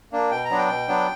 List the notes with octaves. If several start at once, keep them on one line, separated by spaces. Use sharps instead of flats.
A#3 D4
B2 G5
A#5
F#3 B3 D4
G5
B2
F#3 B3 D4